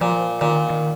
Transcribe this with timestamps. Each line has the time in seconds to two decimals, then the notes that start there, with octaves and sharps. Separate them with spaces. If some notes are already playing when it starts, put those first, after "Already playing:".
0.01 A#2 F3
0.41 A#2 D#3
0.70 D#3